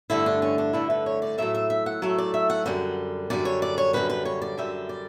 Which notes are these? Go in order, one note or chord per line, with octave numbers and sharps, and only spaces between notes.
G2 D3 A3 E4
D4
C#4
D4
G2 D3 A3 E4
B4
C#5
D5
A2 F#3 A3 E5
E5
E5
F#5
A2 F#3 A3 E5
D5
E5
F#5
F#2 D3 G3 F#5
F#2 D3 G3 D5
C#5
D5
C#5
F#2 D3 G3 B4
B4
C#5
D5
F#2 D3 G3 E5
D5